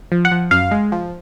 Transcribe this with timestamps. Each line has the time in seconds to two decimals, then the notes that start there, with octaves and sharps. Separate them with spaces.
0.12 F3
0.25 F#5
0.31 F3
0.51 F#2 F5
0.71 G#3
0.92 F3